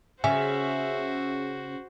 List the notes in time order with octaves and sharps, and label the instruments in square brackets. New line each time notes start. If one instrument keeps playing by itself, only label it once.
[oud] C#3 [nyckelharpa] F#4 C5 [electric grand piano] E5 [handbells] G#5